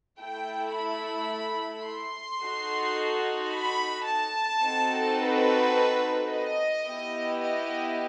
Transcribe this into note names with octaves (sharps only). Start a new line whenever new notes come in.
A3 E4 A4 G5
B5
C6
D#4 F#4 A4
B5
A5
C4 D#4 F#4 A4
B4
D#5
B3 E4 G4
D#5